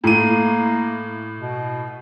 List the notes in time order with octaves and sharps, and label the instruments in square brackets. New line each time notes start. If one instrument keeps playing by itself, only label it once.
[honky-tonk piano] A2 D#7 [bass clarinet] A#3
[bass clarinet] B2